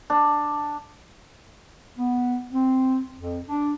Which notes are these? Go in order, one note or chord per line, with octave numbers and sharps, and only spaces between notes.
D4
B3
C4
F2
D4